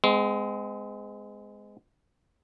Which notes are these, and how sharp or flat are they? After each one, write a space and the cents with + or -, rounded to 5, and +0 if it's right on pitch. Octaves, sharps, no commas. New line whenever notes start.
G#3 +0 C4 -45